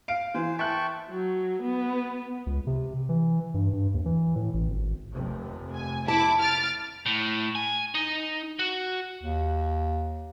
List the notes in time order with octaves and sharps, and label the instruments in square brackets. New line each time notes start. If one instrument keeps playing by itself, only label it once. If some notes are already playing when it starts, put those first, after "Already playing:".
[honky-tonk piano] F5 D7
[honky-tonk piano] E3 [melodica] C5
[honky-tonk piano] E5 F#6 [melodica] G5 A5 C#6
[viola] F#3
B3
[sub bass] C#2
C3
E3
G2
G2
D#2
E3
A2
A1
G#1
[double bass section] F1 D#2 C3
[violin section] G#5
[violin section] E4 D6 [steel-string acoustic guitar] A5
[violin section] F6 A6 D7
[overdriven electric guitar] A2
G#5
D#4
F#4
[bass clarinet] D#2